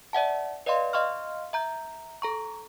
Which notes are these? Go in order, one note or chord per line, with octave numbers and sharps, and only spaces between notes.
D5 E5 F#5 A5
B4 D5 D#5 F5 C6
D#5 F5 C6 C#6 F6
E5 A#5 G6
A4 A#5 C#6